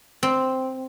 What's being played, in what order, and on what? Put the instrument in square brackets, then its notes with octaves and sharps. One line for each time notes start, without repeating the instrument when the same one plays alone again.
[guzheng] C4